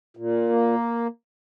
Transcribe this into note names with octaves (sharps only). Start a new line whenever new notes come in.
A#2
A#3